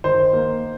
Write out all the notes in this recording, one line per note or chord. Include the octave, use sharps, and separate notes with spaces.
D#3 C5
A#3